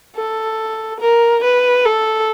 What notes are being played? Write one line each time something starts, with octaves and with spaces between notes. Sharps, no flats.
A4
A#4
B4
A4